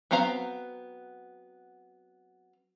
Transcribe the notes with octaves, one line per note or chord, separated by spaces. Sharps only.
F#3 B3 C4 F5 A#5